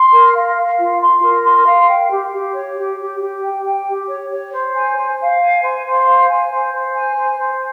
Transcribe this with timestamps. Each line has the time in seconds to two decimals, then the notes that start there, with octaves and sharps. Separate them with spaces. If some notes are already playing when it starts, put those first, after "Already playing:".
Already playing: C6
0.11 A#4
0.34 F5
0.55 F5
0.77 F4
1.00 C6
1.21 A#4
1.43 C6
1.65 F5
1.88 G5
2.10 G4
2.32 G4
2.53 C#5
2.76 G4
2.98 G4
3.20 G4
3.42 G5
3.64 G5
3.86 G4
4.08 C#5
4.30 C#5
4.53 C5
4.74 G#5
4.96 C5
5.19 F5
5.41 G#5
5.63 C5
5.84 C5
6.06 F5
6.28 G#5
6.51 C5
6.72 C5
6.95 G#5
7.16 C5
7.39 C5